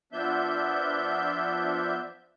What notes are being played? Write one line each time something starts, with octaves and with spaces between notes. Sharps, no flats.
F3 B3 D4 E5 G6